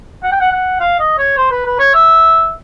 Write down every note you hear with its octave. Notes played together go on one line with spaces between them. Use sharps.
F#5
G5
F#5
F#5
F5
D#5
C#5
C5
B4
B4
C#5
E5